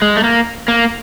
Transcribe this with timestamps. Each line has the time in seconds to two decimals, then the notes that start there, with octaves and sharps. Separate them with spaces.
0.02 G#3
0.17 A3
0.24 A#3
0.68 A#3